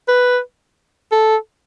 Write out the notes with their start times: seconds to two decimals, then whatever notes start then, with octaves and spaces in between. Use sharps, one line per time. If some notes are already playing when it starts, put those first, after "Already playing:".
0.08 B4
1.12 A4